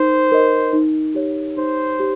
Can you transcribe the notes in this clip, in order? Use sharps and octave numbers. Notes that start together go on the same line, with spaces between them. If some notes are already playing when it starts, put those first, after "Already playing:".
Already playing: D#4 A#4 C5
A#4 D#5
D#4
G4 C#5
D#4 C5
G4